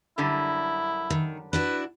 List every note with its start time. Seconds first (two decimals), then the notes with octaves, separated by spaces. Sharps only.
0.18 F#2 D3 G3 E4
1.10 D#3
1.53 D4 E4 F#4 B4